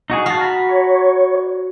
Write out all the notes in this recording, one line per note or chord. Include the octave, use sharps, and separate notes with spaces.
D#4 F#4 G#4
F#4 F5 A5
A#5 B5
C#5